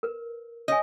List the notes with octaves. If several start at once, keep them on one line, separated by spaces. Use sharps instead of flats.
A#4 B4
C#5 D#5 G#5